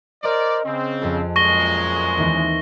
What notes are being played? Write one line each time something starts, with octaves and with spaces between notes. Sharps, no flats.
A#4 C5 D5 D#5 D#6 D7
C#3 C4
F2 G#4 A4
F#2 A#2 G#3 C#6 A#6 G7
D#2 E3 C4